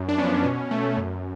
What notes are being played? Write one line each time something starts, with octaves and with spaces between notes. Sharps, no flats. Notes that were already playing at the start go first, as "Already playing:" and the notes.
Already playing: F#2
D4
F3 B3 C#4
B2
A3
F#2